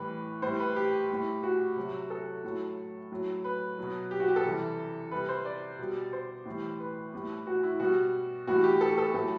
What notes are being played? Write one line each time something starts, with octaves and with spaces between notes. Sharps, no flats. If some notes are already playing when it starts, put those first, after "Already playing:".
Already playing: A2 E3 G3 B4
A2 G3 C5
B4
G4
A2 G3
F#4
C3 F#3
A4
A2 F#3
A2 F#3
B4
B2 F#3
G4
F#4
G4
A4
C3 E3 G3
C3 G3 B4
C5
D5
B2 G3
C5
A2 E3 G3
B4
A2 G3
F#4
E4
B2 G3 F#4
A2 E3 G3 F#4
G4
A4
A4
A2 F#3 A4